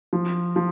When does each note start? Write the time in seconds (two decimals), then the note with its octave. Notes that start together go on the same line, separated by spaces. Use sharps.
0.13 F3
0.56 F3